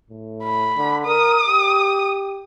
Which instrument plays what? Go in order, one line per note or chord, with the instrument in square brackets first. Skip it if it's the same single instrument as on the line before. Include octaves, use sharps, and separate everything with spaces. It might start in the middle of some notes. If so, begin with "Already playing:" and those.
[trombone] A2
[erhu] B5
[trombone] D3
[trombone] A#4 [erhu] D#6
[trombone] G4